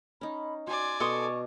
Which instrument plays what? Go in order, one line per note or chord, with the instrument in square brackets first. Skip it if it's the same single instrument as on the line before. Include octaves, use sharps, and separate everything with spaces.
[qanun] C#4 D#4 [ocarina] B5
[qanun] F#4 [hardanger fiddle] D5 G#5 [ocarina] C6
[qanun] B2 [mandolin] A4 C6 D#6 [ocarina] C#6